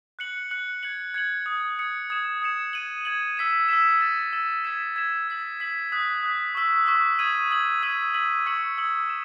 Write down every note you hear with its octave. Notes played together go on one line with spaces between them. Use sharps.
F#6 C#7 F#7
F#6 C#7 F#7
G#6 C#7 F#7
G#6 C#7 F#7
D#6 G#6 C#7
D#6 G#6 C#7
D#6 G#6 C#7 E7
D#6 G#6 C#7 E7
G#6 D#7 F#7
G#6 D#7 F#7
E6 B6 E7
E6 B6 E7
E6 A6 E7
E6 A6 E7
G#6 B6 E7
G#6 B6 E7
E6 B6 F#7
E6 B6 F#7
D#6 F#6 B6
D#6 F#6 B6
C#6 E6 B6
C#6 E6 B6
D#6 G#6 D#7 F#7
D#6 G#6 D#7 F#7
E6 G#6 B6 D#7 F#7
E6 G#6 B6 D#7 F#7
C#6 E6 G#6 C#7 F#7
C#6 E6 G#6 C#7 F#7
E7